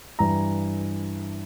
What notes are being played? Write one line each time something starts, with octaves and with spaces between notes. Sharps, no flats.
G2 E3 A#5